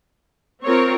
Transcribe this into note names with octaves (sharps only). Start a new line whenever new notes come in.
C4 F4 A#4 C#5